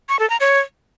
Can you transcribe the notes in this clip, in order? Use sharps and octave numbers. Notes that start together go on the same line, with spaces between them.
C#6
A4
A#5
C#5